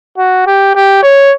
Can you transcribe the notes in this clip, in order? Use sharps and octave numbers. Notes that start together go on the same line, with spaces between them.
F#4
G4
G4
C#5